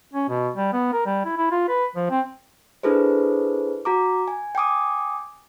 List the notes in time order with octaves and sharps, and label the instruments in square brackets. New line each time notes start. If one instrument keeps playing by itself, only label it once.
[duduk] C#4
B2
G3
B3
A#4
G3
E4
E4
F4
B4
F3
C4
[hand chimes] D4 E4 G#4 A4 B4 C5
F#4 A#5 D6
G#5
G5 G#5 D6 D#6